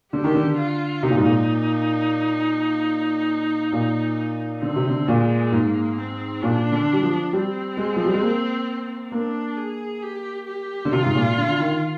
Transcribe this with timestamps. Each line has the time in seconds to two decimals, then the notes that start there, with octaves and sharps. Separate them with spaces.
0.13 D3 G4
0.24 D#3
0.35 D3
0.57 F4
1.03 C3 D#4
1.09 A#2
1.17 G#2
1.24 A#2
3.72 A#2
4.62 D3 C4
4.76 C3
4.88 D3
5.08 A#2 G#3
5.52 G#2 A#3
5.98 C4
6.42 A#2 D4
6.72 D3
6.93 G3
7.03 F3
7.33 G3 C4
7.77 G#3
7.96 F3
8.05 G3
8.13 G#3
8.22 A#3
9.12 A#3 D4
9.57 G#4
10.02 G4
10.47 G4
10.85 D3
10.92 C3 F4
11.05 G#2
11.15 A#2
11.38 D3
11.60 D#3